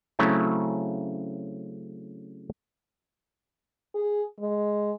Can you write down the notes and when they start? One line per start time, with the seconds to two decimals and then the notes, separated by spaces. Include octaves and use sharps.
0.19 C#3 F#3 A3 C4 C#4 E4
3.95 G#4
4.40 G#3